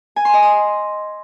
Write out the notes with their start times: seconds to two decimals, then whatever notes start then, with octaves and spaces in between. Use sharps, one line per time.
0.16 G#5
0.25 C6
0.34 D#5
0.42 D#6